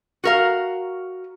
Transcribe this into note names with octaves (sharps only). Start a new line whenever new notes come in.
F#4 A#4 F5